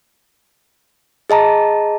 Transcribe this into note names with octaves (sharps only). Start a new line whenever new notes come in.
G#4 D#5 A5 A#5